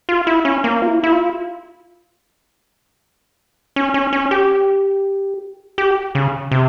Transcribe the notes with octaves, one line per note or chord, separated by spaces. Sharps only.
F4
E4
C#4
A#3
F4
E4
E4
F4
C#4
C#4
C#4
G4
G4
C#3
C3